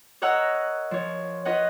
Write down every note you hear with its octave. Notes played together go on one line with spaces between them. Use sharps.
A#4 C#5 D#5 F#5 A#5 E6
F#6
F3 C#5
F4 B4 C#5 D#5 F#5